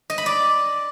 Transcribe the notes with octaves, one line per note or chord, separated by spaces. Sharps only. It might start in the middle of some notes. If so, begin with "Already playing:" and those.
D#5
B5
D5